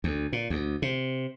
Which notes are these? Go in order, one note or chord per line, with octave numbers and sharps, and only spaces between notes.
D2
A#2
D2
C3